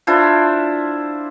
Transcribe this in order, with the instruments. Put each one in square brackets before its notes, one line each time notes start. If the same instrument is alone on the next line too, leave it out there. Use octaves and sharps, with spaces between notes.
[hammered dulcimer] D4 E4 F4 C5